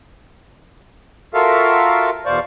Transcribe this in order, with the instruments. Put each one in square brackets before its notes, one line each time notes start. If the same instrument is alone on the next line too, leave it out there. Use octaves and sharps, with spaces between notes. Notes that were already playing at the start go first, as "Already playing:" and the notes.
[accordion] F4 F#4 A4 A#4 E5 F5
E2 B2 C5 D5 F5 C#6